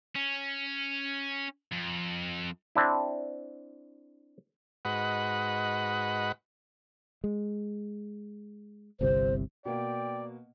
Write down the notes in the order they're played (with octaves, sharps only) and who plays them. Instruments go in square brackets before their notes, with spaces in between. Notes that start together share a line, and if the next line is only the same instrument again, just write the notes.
[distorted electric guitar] C#4
F2
[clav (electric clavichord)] C4 D4 E4
[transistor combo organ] G#2 F#4 B4 D#5 F#5 B5
[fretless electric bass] G#3
[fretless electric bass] G1 C2 C3 [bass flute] C5
[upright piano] B2 A#3 [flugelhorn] D5 [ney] G5